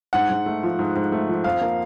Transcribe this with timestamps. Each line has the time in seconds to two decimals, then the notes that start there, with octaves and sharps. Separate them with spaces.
0.13 G#2 F#5
0.29 G#2
0.46 A3
0.63 F3
0.79 G#2
0.95 G#2
1.12 A3
1.29 F3
1.44 F2 F5
1.61 A#3